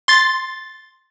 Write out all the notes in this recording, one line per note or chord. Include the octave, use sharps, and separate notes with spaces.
C6 A6